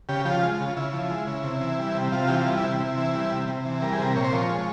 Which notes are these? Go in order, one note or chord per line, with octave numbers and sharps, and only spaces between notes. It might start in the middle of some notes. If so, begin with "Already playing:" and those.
C#3 G4
F3 G4
F4
G#3
F4
C#3
C#3 E4
F3
G#3
C#3
C3
E3
G3
C3
C3 F4
E3 G4
F4
G3
E4
C3
C3
E3
G3
C3
C3
E3
G3 A#4
G#4
C3 A#4
A#2 C#5
C5
F3 C#5
G#3